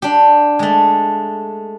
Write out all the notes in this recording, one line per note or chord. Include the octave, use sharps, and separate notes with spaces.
D4 G4
G#3 A3